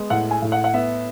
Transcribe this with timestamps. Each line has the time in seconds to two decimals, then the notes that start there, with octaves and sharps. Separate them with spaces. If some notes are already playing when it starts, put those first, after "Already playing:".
Already playing: G#3 B3
0.10 A2 F#5
0.31 G#5
0.42 A2
0.52 F#5
0.64 F#5
0.74 B3 E5